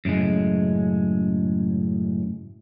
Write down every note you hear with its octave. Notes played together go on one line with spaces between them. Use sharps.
F#2 A2 C#3 G#3